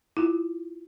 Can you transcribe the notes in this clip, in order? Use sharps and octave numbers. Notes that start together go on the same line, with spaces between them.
E4 F4